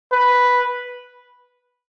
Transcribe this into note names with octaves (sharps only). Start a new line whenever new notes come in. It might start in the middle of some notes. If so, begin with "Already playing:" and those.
B4